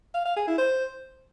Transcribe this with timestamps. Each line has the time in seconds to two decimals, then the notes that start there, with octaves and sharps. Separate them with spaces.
0.14 F5
0.25 F5
0.36 G#4
0.47 E4
0.58 C5